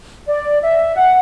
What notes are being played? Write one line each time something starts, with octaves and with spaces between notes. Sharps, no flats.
D5
E5
F#5